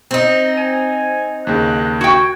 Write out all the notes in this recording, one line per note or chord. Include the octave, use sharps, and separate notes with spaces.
C4 D#4
G#5 D#7
D#2 C#3 F#6
F#4 G5 G#6